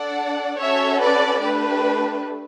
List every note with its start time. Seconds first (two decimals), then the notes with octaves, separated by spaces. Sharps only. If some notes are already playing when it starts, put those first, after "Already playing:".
Already playing: D4 A4 D5 F#5
0.60 C#4 F#4 A4 C#5 E5
1.01 B4 D5
1.42 A3 D4 G4 B4